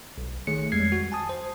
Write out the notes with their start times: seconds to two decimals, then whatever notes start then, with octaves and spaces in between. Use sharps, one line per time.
0.18 B1
0.47 D#3 A3 G#4 C#5 C#7
0.72 F2 G3 G#3 G#6 C7
0.92 F#4
1.12 G#5 A5 D#6
1.29 C5